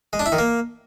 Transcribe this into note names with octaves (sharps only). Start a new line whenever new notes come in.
G#3
D4
E4
D#3
A#3